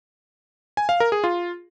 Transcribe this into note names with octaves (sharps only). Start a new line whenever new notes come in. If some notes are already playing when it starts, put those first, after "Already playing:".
G#5
F5
A#4
G#4
F4